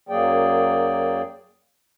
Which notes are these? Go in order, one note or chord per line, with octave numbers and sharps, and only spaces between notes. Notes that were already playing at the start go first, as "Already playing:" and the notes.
F#2 F#3 A#3 G#4 D5 G5